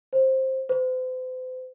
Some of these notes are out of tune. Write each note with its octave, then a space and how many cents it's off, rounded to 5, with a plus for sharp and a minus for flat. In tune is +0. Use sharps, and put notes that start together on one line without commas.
C5 +10
C5 -40